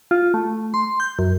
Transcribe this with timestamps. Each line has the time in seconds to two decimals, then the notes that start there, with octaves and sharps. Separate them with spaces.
0.11 F4
0.34 A3
0.74 C6
1.00 G6
1.19 F#2